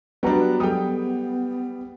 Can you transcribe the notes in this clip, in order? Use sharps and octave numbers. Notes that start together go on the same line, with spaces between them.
F#3 G3 B3 D4 F#4 A#5
F#3 G3 B3 G#4 A4 G5 D#6